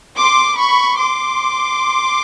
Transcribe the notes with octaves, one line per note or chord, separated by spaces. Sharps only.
C6 D6
B5 C#6
C6 D6